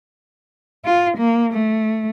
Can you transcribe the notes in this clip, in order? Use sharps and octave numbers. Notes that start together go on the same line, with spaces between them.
F4
A#3
A3